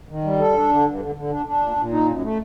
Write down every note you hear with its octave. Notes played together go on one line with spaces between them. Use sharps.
D#3
G3
A4
D4
D3
G2
D3
D3
D4
D4
A#2
A#2
D#4
F#2
A3